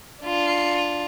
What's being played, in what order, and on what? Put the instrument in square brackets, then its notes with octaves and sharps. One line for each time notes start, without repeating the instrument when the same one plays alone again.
[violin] D4 F4